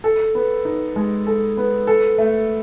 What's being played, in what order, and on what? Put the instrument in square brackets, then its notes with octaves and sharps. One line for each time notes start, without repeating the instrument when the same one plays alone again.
[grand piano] A4
B3
D#4
G#3
A4
B3
A4
A3